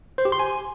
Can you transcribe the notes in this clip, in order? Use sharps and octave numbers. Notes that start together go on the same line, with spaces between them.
C5
G4
C6
G#5